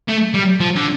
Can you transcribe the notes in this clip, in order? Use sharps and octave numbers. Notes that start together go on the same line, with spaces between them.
A3
G3
F3
D3